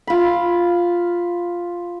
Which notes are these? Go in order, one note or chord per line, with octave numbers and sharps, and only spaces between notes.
F4 B5